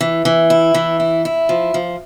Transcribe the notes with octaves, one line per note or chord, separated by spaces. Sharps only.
E3
E3
E4
E3
E4
E4
F3
F3